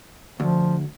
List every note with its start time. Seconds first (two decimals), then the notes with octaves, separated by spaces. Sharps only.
0.40 D2 F3